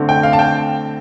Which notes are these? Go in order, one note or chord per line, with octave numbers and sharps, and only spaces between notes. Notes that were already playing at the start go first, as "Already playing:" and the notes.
Already playing: D3 A3 C4
G5
F5
A5
G5